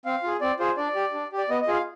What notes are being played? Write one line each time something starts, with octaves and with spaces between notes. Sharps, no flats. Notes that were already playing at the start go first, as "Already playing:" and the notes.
C4 F5
F4 G#4
C4 D5
F4 G#4 C5
D4 D5
G4
D4
G4
D5
B3 D#5
D#5
F4 G#4
F5